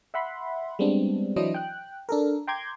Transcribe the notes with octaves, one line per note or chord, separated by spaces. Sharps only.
E5 F#5 B5 C6
G3 G#3 B3 C4 D4
E3 F#3 D4 E4 C5 D#5
G5 F#6
D4 A4 A#4
G5 A#5 C6 D6 G6 G#6